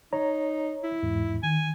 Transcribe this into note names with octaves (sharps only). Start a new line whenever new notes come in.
D#4 C#5 A#5
E4
E2 G#2
D#3 G#5